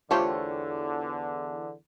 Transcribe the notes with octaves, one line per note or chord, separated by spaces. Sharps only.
E2 D3 A3 F4 G4 C5 C#5